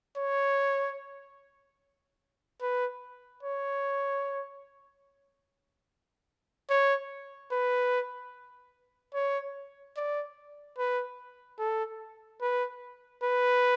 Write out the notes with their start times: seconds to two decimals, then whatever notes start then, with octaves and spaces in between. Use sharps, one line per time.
0.17 C#5
2.61 B4
3.43 C#5
6.70 C#5
7.51 B4
9.14 C#5
9.96 D5
10.78 B4
11.59 A4
12.41 B4
13.23 B4